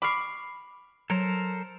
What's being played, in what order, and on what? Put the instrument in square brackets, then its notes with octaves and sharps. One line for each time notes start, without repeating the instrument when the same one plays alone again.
[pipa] B5 C#6 [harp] D6 F6 C7
[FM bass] F#3 [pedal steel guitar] A4 A#4 C5